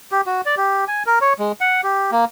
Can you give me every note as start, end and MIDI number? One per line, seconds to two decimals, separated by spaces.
0.12 0.21 67
0.26 0.41 66
0.46 0.55 74
0.57 0.85 67
0.88 1.03 80
1.06 1.19 70
1.21 1.33 73
1.39 1.52 56
1.61 1.81 78
1.83 2.11 67
2.12 2.25 58